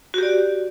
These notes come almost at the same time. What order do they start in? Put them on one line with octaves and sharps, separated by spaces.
F#4 G4 D5